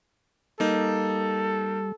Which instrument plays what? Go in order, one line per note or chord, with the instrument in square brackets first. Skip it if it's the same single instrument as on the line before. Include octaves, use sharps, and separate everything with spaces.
[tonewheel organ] G3 [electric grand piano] A#3 D#4 [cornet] A4